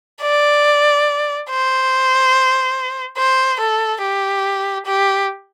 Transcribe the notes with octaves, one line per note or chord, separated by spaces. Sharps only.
D5
C5
C5
A4
G4
G4